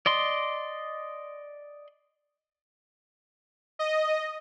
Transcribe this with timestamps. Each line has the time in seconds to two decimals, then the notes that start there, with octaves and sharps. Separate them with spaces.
0.06 D5 D#5 C6
3.79 D#5